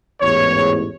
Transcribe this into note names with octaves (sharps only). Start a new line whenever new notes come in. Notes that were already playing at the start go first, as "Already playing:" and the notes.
A1 E2 G#2 C#5